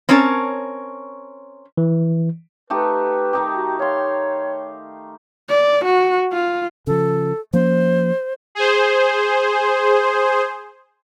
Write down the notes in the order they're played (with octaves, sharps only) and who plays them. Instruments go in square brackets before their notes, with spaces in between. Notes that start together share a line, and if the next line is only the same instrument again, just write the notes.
[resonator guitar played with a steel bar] C4 C#4 A#4 C#5 A5
[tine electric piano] E3
[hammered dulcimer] A3 D#4 G4 [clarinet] B4
[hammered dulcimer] D#3 D#4 G4
[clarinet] F#4
[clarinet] C#5 [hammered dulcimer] F5 C6
[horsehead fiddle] D5
F#4
F4
[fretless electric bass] C#3 F3 [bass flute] A4
[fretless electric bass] F3 A#3 C#4 [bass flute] C5
[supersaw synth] G#4 C5